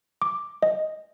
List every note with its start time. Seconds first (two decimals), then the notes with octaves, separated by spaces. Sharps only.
0.22 D6
0.63 D#5